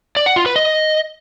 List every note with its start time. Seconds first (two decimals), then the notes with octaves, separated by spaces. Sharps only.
0.16 D5
0.26 F#5
0.36 F4
0.46 B4
0.56 D#5